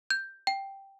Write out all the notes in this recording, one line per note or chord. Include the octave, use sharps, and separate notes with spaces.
G6
G5